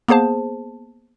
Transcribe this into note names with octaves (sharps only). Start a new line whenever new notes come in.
A#3 B3 G#4 C5 A5